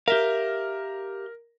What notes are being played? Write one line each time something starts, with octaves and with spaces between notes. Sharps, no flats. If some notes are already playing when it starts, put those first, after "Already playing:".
G4 A#4 E5 F5